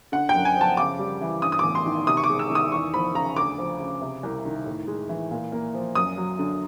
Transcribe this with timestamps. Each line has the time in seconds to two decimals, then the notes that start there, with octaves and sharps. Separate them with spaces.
0.12 D3 F#5
0.29 G5
0.35 F#2
0.45 G#5
0.56 F3
0.61 A5
0.77 C#3 D6
0.99 G3
1.21 E3
1.42 G2 D#6
1.52 D#6
1.59 A1 D6
1.75 C6
1.86 D#3
2.07 C3 D#6
2.17 C#6
2.24 D6
2.29 G#3
2.39 E6
2.50 D#3
2.55 D#6
2.72 E2 C#6
2.94 F3 B5
3.14 C#3 A#5
3.36 D2 D6
3.58 F3
3.80 C#3
4.02 C3
4.23 C2
4.45 D#3
4.66 A2
4.87 G#3
5.09 E3
5.31 A#2
5.52 A#3
5.74 F3
5.95 F#2 D#6
6.17 F#3
6.39 D3